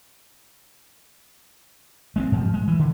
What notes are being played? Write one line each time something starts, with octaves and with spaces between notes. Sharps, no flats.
G#3 B3 C4
G#2 F3
G#3
E3
D3